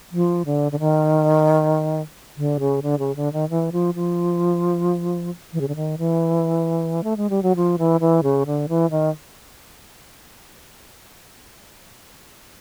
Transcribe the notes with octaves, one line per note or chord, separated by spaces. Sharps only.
F3
D3
D3
D#3
D3
C#3
D3
C#3
D3
D#3
E3
F3
F3
E3
C#3
D3
D#3
E3
A3
G#3
G3
F#3
F3
E3
E3
C#3
D3
E3
D#3